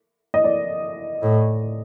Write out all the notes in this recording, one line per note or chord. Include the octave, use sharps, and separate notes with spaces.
D#5
D5
A2